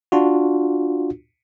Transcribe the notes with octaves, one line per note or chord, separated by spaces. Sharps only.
D4 F4 F#4